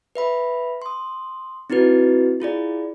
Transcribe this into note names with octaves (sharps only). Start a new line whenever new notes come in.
B4 E5 B5
C6 D#6
C4 D#4 E4 F#4 B4
E4 F4 G#4 D5